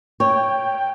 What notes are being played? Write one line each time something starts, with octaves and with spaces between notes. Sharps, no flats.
C#5 G5